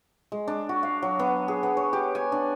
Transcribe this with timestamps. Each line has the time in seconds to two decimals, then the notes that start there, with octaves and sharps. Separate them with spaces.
0.32 G#3
0.48 D4
0.69 F#4
0.83 F5
1.02 F#3
1.19 B3
1.48 G#4
1.63 B3
1.77 C#5
1.93 G4
2.15 G#5
2.32 D4